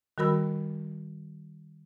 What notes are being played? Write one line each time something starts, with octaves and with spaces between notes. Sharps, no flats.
D#3 G3 F#4 A#4 B5 E6